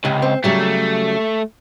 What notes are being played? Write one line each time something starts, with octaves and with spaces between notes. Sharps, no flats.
C#2 C3
C4
C#3 F#3 G3 A3